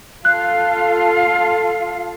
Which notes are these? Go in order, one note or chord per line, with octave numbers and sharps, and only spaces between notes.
F4 A4 F5 F#6